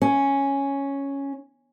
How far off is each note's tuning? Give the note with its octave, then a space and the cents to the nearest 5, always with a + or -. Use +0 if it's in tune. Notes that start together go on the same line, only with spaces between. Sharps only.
C#4 +0